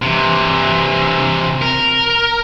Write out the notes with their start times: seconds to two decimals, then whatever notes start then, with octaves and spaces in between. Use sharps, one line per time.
0.02 C3 E3
1.62 A#4